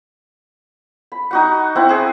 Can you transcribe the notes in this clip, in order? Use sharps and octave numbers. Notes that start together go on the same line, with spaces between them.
B5
D#4 F#4 F#5
C4 E4 F#5
C4 G#4